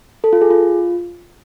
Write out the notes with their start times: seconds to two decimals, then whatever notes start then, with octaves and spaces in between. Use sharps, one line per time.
0.24 A4
0.33 F4
0.42 G#4
0.50 F4